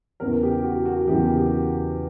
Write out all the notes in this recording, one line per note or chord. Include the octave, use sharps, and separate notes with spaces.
E2 C#3 E3 A#4
G4
F#4
F#4
E2 C#3 E3 G4
G4